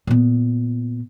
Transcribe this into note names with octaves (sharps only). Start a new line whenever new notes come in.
A#2 B3